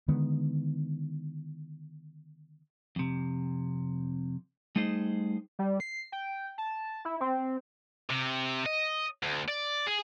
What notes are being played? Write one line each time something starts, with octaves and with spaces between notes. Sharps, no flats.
D3 D#3 G#3 B3
F2 C3
G3 A3 D#4 G#4 C5 D#5
G3
C7
G5
A5
E4
C4
C3
D#5
D2
D5
G#4